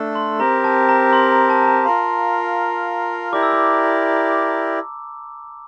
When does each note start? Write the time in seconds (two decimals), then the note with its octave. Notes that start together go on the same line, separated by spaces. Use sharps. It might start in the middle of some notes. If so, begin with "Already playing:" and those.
Already playing: A3 D4 A4
0.15 C6
0.39 C4 G4 A#4 A#5
0.64 A5
0.89 A#5
1.13 C6
1.31 A#5
1.50 A5
1.62 A5
1.67 A#5
1.85 F4 A#4 F5 C6
3.32 E4 G4 A#4 D5 D6
3.43 E6
3.52 D6